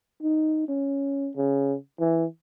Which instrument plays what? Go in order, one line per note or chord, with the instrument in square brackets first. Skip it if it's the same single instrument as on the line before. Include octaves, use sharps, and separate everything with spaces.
[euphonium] D#4
C#4
C#3
E3